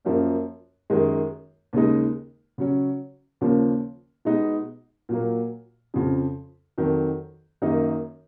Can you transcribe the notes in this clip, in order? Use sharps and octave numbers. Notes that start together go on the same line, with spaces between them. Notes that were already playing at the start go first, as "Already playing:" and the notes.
F#2 F3 A#3 C#4
F#2 D#3 G#3
D#2 C#3 G#3 D#4
C#3 F#3 C#4
D#2 C#3 F3 A#3 C#4
B2 G#3 B3 D#4
A#2 F#3 A#3
F2 C#3 F3
F2 D#3 F#3
F#2 D#3 A#3 D#4